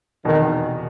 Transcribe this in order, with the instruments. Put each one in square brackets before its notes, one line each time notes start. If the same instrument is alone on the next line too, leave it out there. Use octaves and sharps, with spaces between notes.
[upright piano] F1 E2 B2 [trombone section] D#3